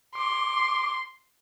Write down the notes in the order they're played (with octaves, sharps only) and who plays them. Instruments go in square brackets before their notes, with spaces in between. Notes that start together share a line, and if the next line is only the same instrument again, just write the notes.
[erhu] C6 [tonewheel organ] D6